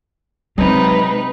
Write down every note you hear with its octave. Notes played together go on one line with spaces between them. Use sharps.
C3 F#3 G#3 C4 D#4 B4